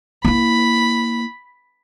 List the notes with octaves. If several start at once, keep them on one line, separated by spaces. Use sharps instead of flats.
A#3 E4 B5